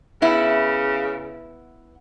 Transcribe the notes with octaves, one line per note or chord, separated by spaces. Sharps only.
C#3 B3 E4